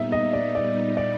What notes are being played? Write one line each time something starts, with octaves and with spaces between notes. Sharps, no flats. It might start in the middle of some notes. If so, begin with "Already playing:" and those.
Already playing: A#2 G3 B3 D#4 E5
D#5
D5
D5
D5